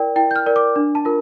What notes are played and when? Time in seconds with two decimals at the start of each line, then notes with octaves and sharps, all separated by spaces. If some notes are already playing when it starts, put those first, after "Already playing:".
Already playing: E4 A#4 D5 G5
0.16 E4 G5
0.31 G6
0.36 F6
0.46 A#4 D5
0.56 D6
0.76 D4
0.95 A5
1.05 F4 A#4